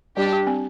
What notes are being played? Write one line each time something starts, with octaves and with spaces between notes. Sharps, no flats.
G3 D4 G4
G4
C4